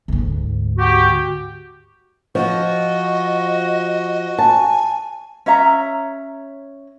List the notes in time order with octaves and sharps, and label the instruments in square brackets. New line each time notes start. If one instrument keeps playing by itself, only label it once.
[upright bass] D2 G#2
[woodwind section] F#4 G4
[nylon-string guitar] F3 [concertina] F#4 [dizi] D#5
[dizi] G#5 [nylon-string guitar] A5
[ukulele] C#4 C#5 E5 A#5